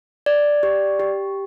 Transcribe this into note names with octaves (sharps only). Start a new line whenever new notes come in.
D5
G4
G4